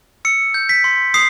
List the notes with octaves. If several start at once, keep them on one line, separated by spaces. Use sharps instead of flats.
E6 C#7
G6
B6
C6
D#6 C7